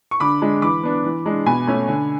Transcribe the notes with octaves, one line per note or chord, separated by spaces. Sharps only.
C#6
D3 B5 D6
G#3 D4
E3 B5 D6
B3 D4
E3
G#3 D4
B2 G#5 B5
A3 C#4
D3